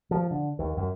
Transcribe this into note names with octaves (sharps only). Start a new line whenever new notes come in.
F3
D3
D#2
F#2